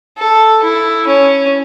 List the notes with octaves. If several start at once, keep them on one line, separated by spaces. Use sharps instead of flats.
A4
E4
C#4